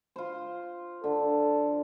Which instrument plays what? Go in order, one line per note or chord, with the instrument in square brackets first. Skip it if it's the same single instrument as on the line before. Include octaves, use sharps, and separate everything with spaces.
[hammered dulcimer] F4 C5
[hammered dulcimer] D3 [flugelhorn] A4